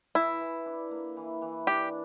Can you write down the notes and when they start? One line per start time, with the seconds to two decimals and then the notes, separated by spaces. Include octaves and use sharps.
0.15 E3 E4
0.41 E3
0.66 D4
0.91 A#3
1.17 E3
1.42 E3
1.67 D4 G4